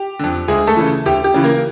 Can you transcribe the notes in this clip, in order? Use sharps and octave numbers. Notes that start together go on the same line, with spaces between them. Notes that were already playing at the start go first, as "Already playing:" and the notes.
Already playing: G4
F2 D3
D2 G#3 G#4
A3 A4
C#3 E3
D2 G4
G4
C#3 E3
A#3 A#4